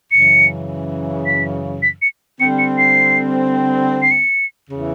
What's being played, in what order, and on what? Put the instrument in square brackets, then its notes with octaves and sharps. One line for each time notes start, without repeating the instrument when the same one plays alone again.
[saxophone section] F#2 C#3 E3 [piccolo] C#7
[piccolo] B6
B6
C#7
[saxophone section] D3 G3 C4 [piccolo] C#7
[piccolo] C#7
C7
C7
C#7
[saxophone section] E2 C#3 E3